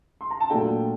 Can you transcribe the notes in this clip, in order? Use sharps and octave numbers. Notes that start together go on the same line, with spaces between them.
C6
A#5
A5
A#2 F#3 A3 D4 G5